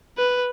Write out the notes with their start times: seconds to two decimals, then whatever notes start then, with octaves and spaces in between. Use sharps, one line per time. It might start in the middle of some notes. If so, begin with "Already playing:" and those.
0.17 B4